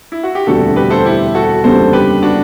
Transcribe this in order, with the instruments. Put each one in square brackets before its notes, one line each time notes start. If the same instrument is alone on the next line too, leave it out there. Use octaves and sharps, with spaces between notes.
[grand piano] E4
F#4
G4
[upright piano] E1 D2 C3 G3 D4 [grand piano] F#4 A4
[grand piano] G4 B4
A4 C5
E4 G4
F#4 A4
[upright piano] F#1 E2 D3 G3 B3 [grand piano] A4 C5
[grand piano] G4 B4
D4 F#4